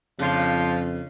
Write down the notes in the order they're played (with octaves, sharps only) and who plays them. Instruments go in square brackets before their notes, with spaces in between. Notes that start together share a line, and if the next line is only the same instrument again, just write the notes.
[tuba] F2 [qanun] C#3 D4 [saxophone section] F3 F4